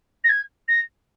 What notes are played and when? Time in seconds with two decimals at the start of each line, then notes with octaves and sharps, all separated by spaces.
0.24 A#6
0.29 G#6
0.68 A#6